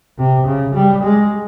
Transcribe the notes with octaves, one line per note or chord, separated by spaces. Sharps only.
C3
C#3
G3
G#3